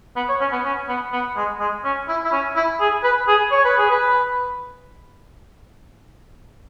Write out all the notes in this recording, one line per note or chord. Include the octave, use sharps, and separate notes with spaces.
B3
C#5
C#4
B3
C#4
B3
B3
G#3
G#3
C#4
E4
E4
C#4
E4
G#4
B4
G#4
C#5
B4
G#4
B4